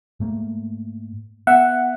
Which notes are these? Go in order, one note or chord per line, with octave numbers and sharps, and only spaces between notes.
G#2 A3 A#3
B3 E5 F#5